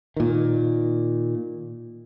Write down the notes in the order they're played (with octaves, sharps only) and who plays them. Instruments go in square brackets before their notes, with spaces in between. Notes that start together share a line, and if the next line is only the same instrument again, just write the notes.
[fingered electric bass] A#2 D#3